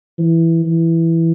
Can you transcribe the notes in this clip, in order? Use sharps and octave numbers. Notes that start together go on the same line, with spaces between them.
E3
E3